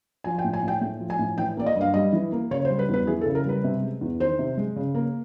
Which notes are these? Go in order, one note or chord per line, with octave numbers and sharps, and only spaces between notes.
F3 G#5
G5
A2
G#5
A2
G5
A3 G5
F3
G#5
A2
E3 G5
A#3 D5
D#5
G2
F5
G3 D#5
E3
A#3
C#3 C#5
C5
G3
B4
E2 B4
E3 G#4
A4
C#3
A#4
G3 B4
C3
G#3
E2
D#3 C5
C3
G#3
C#3
A#3